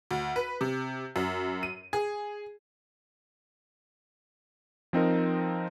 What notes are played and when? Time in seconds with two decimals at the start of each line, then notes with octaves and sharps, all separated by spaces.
0.11 D2
0.36 B4
0.61 C3
1.16 F#2
1.63 D#7
1.93 G#4
4.93 F3 C4 D#4 A#4